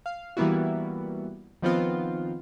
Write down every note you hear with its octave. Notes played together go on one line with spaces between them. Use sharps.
F5
E3 G3 A#3 B3 E4 F#4
D#3 F3 B3 C4 F4